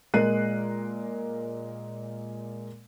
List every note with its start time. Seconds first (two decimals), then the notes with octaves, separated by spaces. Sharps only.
0.14 A#2 G#3 A#4 F#6 C7 D#7